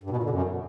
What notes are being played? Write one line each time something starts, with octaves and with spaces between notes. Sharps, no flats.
G2
B2
A#2
D3
F#2